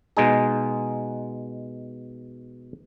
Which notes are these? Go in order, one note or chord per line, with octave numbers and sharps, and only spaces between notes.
B2 G#3 D#4 G#4